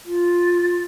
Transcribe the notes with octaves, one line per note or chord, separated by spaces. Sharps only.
F4